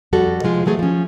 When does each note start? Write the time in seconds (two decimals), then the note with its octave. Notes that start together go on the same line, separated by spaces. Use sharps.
0.13 F2 G3 F#4 A4
0.43 C3 F3 G#3 F4
0.66 E3 F#3 A3 G#4
0.79 F3 C#4